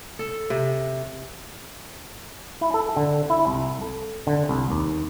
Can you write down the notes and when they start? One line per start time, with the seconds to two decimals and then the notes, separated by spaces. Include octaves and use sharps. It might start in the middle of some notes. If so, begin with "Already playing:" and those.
0.19 A4
0.50 C3
2.61 E4
2.74 A4
2.97 D3
3.30 E4
3.47 C2
3.81 A4
4.27 D3
4.49 C2
4.70 D#2